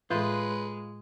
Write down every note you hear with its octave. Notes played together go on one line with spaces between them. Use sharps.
A2 E3 G#3 F4 B4